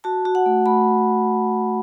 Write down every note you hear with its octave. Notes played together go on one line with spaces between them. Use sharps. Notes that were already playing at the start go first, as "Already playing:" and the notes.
F#4 A5
F#4
F#5
A3
A3 B5